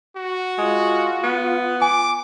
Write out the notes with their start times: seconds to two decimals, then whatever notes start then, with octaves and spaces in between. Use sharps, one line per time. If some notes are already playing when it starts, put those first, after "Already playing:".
0.17 F#4
0.58 G#3 F4
1.24 B3
1.82 G#5 D6